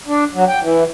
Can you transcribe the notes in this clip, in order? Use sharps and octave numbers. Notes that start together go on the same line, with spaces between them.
D4
F#3
G5
E3